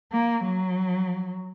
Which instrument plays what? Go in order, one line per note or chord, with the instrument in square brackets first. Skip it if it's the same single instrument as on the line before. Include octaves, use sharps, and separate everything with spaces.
[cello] A#3
F#3